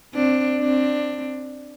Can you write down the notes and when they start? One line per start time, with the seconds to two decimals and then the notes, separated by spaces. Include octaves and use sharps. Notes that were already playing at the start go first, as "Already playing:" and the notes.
0.14 C4 D4
0.59 C4 D4